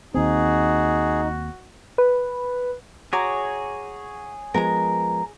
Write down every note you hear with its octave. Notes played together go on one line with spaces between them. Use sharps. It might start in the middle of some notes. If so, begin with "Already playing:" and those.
D#2 C4 D#4 F#4 G#4
B4
F#4 G#4 C#5 A#5 D6
F3 G#3 B3 A#4 A#5